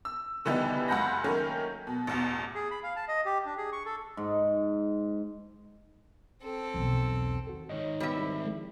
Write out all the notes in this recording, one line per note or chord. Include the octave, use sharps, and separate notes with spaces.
E6
B2 D3 E3 G3 B3 D#4
C#2 F#2 F#5 B5 G6 A#6
D#3 F#3 A3 A#3 C#4
B2
A1 E2 B2
G#4
B5
F5
A5
D#5
G4
D4
G#4
C#6
A4
G#2
C4 A4
B1 E2
D#3 F#4 A4
G#2 D#3 D#4 C#5 D#5
B2 G3 E5
C2
F3 G#3 A3